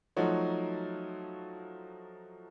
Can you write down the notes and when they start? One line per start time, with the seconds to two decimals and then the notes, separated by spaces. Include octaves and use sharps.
0.17 F3 F#3 A3 D#4 F#4 C#5